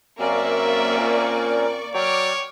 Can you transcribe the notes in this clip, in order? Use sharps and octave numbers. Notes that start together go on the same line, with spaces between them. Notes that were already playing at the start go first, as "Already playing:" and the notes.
F#2 A#3 C4 C#4 A#4 D5 E5 C#6
A#2
F#3 C#5 D5 G5 D6 F6